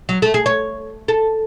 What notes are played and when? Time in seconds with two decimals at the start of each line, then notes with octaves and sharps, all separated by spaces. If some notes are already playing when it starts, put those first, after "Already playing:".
0.09 F#3
0.22 A3
0.34 G#4
0.46 C#5
1.08 A4